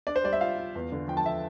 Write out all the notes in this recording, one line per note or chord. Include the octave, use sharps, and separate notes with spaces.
D4 D5
C5
G3 D5
E5
F4 F5
F4
E2
D3
F3 G5
A5
E5